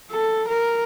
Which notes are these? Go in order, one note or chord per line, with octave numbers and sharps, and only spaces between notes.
A4
A#4